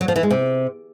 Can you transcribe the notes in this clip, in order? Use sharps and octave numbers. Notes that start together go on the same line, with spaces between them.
F#3
F3
E3
G#3
C3